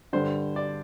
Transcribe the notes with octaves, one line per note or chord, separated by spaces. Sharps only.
G2 D3 C5
D5